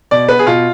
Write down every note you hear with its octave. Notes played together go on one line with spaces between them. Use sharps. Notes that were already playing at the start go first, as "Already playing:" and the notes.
B2 D5
B3 B4
G#4
B2 F4